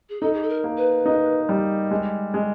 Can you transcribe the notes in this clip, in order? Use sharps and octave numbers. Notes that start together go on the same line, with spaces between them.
G#4
D#4 A4
G#4
A4
A#4
A#3
B4
D#4
G3
G#3
G#3